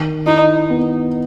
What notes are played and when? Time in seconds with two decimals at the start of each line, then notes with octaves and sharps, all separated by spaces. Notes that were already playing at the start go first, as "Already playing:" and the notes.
Already playing: D#3
0.26 D#4 E4
0.70 B3